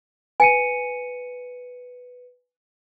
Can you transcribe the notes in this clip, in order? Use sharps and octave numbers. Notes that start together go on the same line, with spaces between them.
B4 G#5 C#7 D#7